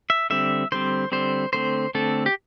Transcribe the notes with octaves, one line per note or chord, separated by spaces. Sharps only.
E5
D3 G3 C4 E5
D3 G3 C4 C5
D3 G3 C4 C5
D3 A3 C4 C5
D3 A3 C4 A4
G4